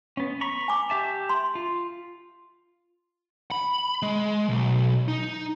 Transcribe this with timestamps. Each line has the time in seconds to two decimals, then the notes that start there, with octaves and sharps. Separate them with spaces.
0.17 B3 C#4
0.41 A#5 B5 C#6
0.68 G#5 D6
0.90 G4 E5 A5
1.29 C6
1.55 F4
3.51 B5
4.02 G#3
4.49 B1
5.08 D#4